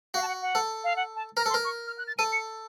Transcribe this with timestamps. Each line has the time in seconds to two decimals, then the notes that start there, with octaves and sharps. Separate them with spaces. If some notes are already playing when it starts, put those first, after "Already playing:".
0.14 F#4 F5
0.22 A5
0.28 F#5
0.42 F#5
0.55 A4
0.84 F5
0.96 F#5
1.16 A5
1.37 A#4 A#5
1.46 A4
1.50 C6
1.54 A#4
1.65 C#6
1.87 F6
1.98 F#6
2.08 A6
2.18 A4 D#7
2.32 C#7